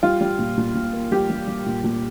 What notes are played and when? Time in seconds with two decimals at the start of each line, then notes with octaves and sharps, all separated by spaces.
0.03 G3 F4
0.21 G3
0.39 A#2
0.57 A#2
0.75 A#2
0.93 A#3
1.11 G3 G4
1.30 G3
1.47 G3
1.66 A#2
1.84 A#2